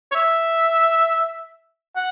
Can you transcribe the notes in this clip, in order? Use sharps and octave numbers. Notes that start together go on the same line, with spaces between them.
C#5
E5
F#5